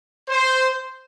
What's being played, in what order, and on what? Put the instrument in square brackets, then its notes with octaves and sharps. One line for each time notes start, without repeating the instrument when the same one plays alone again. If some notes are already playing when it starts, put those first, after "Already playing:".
[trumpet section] C5